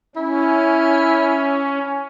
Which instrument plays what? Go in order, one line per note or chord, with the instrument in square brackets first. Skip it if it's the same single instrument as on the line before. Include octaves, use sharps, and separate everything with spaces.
[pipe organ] C#4 [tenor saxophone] E4